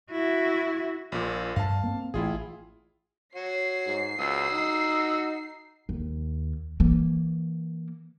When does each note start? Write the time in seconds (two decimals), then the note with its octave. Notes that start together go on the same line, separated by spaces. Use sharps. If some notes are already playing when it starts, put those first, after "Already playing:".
0.11 E4 F#4
1.12 A#1 A#2
1.56 G2 F5 A5
1.84 A#3 C4
2.14 A1 E4 F4 G#4
3.35 F#4 C#5 C7
3.86 G#2
4.19 C#2 F#4 D#6 E6
4.52 D#4
5.89 D#2
6.80 E3 A#3